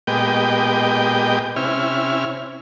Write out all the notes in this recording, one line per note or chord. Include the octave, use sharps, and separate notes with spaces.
A#2 G#3 B3 G4 D#5 G5
C3 C#4 E4 F6